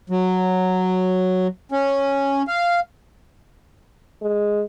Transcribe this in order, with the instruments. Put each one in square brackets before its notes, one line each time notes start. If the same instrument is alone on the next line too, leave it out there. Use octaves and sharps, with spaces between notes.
[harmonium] F#3
C#4
F5
[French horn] G#3